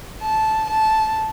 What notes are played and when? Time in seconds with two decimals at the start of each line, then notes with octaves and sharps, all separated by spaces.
0.22 A5
0.70 A5